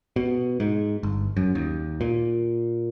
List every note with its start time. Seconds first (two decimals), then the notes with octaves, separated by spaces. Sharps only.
0.16 B2
0.60 G#2
1.03 G1
1.37 F#2
1.55 D#2
2.01 A#2